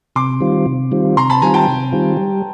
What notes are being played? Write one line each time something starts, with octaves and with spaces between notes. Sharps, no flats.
C3 C6 D6
D#3 G3 C4 F4
C3
D#3 G3 C4 F4
C3 A#5 C6
A5 B5
D#3 G3 C4 F4 G#5 A#5
G5 A5
C3
D#3 G3 C4 F4
G3